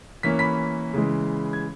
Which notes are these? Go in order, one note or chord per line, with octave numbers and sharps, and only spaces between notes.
E3 A#3 C#4 B6
B5 B6
C#3 E3 G#3
G#6